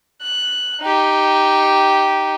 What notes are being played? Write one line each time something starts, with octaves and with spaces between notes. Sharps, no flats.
F#6
D#4 G4